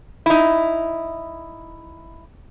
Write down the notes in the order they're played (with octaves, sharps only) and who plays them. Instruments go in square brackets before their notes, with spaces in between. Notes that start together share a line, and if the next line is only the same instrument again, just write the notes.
[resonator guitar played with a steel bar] D#4 E4